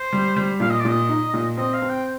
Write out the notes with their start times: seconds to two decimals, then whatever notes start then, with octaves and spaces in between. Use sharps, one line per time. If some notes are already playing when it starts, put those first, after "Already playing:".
Already playing: C5
0.13 G3
0.36 G3
0.60 A#2 F5
0.70 D#5
0.80 D5
0.85 A#2 D#5
1.09 D#4
1.34 A#2
1.57 C4 D#5
1.73 F5
1.82 C4
1.90 G5